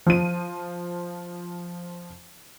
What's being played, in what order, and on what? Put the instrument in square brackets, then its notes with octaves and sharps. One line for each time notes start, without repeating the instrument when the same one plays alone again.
[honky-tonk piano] F3 D#7